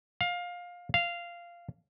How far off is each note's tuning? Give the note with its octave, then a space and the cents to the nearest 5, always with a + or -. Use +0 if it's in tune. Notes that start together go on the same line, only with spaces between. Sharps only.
F5 +20
F5 -10